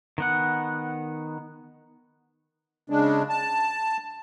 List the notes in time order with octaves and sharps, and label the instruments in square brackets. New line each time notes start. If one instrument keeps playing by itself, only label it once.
[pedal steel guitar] D#3 B3 F#5
[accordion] C#3 G#3 D4
A5